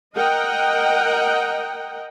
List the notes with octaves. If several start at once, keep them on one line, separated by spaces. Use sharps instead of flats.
A#4 D#5 F#5 G5